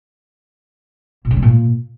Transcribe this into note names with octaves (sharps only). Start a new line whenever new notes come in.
A#2
C#3
G#3
A#2